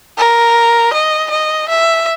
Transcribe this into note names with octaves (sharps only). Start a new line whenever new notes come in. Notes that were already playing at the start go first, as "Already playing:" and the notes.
A#4
D#5
D#5
E5